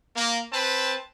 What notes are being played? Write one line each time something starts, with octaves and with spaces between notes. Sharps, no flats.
A#3
C4 B4 A5